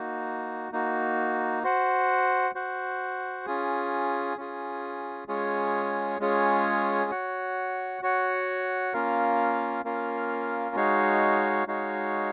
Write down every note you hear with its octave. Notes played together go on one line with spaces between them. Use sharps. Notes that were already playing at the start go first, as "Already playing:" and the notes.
Already playing: A#3 D#4 F#4
A#3 D#4 F#4
F#4 C5 F#5
F#4 C5 F#5
C#4 F4 G#4
C#4 F4 G#4
G#3 C#4 F4 G#4 C#5
G#3 C#4 F4 G#4 C#5
F#4 C#5 F#5
F#4 C#5 F#5
A#3 C#4 F4 A#4 F5
A#3 C#4 F4 A#4 F5
G#3 D#4 F#4 C#5 F5
G#3 D#4 F#4 C#5 F5